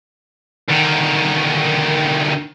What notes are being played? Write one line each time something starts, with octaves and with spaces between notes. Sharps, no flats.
D2 D#3